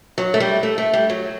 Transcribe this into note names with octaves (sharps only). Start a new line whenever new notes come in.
F#3
A3
G3
A3
A3
G3
F#3